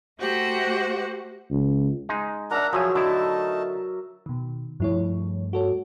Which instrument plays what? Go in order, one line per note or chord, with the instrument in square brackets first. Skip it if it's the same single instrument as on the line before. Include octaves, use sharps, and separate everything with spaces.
[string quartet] A3 F#4 G4 C5 F#5
[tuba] C#2
[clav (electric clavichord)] G#3 D#4
[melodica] D4 F#5 A#5 [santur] A#4 E5
[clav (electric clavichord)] F3 G#5 [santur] F#3 E5 [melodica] G#4
[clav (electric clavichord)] D3 E4 [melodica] A3 D#4 A5 [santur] D6
[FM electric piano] B2 D#3
[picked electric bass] G2 A3 [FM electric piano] F3 E4 C#5
[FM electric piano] F#4 A4 C#5